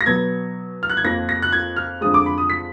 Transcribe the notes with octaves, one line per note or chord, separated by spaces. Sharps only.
A#6
B2 F#3 B3 G#6
F6
F#6
G#6
F2 F3 A#3 D#4 A#6
A#6
F#6
G#6
F6
F2 D3 F3 G#3 D#6
D6
B5
D#6
B6